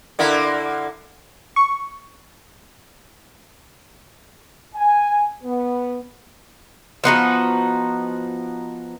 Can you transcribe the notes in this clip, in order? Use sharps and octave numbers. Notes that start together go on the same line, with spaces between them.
D3 A#3 E4
C#6
G#5
B3
F3 B3 D#4 F#4